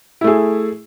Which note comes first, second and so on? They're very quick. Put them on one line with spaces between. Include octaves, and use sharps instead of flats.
E4 A3 G#4